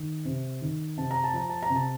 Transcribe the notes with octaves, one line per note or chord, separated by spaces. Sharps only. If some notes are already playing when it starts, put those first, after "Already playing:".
Already playing: D#3
C3
D#3
C3 A5
A#5
A5
F3 A#5
A5
A#5
C3
A5